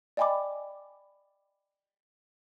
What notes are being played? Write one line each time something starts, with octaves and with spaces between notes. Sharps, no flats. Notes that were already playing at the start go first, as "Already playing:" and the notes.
D5 D#5 G5 G#5 B5 D6